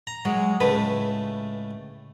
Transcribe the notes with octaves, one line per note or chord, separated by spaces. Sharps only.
A#5
F#3 G#3
C#2 A2 A3 B4